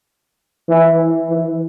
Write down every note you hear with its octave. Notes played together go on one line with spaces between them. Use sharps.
E3
E3